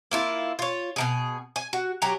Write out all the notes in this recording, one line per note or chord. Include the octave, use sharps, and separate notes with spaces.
A#3 E4 F4
F4 C#5
B2 D#3 G#4
G#5
F#4
F#3 G4 G#5 A#5